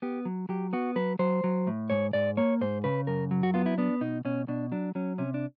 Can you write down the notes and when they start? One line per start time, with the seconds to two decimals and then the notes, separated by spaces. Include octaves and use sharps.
0.02 B3 G4
0.25 F#3
0.49 F#3 G4
0.73 B3 F#4
0.96 F#3 B4
1.19 F#3 C5
1.44 F#3
1.67 A2
1.90 G#2 C#5
2.13 G#2 D5
2.37 A#3 C#5
2.61 G#2 C5
2.84 C#3 B4
3.07 F#2 A#4
3.31 F#3
3.43 F#4
3.54 B3 F4
3.66 E4
3.78 B3 D4
4.01 B2 D#4
4.25 B2 C#4
4.48 B2 D4
4.72 F#3 D4
4.95 F#3 C#4
5.18 C3 C#4
5.34 D4